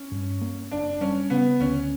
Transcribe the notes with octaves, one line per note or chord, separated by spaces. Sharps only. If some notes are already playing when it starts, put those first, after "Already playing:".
Already playing: C#4
G2
A#3
F#1 D4
G3 C#4
C#3 B3
D2 C#4